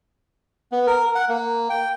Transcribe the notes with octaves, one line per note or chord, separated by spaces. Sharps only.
B3
A#4
F#5
A#3
G5